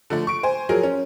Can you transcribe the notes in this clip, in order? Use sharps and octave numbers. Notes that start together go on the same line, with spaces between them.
D3 F3 A3
C#6 D7
C5 G#5
F3 F#3 G#4 A#4
C#4